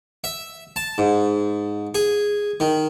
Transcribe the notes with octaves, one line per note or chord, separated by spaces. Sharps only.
E5
A5
G#2
G#4
D#3